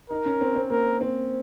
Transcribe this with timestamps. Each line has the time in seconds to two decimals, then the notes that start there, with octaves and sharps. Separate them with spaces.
0.10 D#4 A#4
0.26 C#4
0.41 C4
0.55 C4
0.70 A#3 A#4
1.01 C4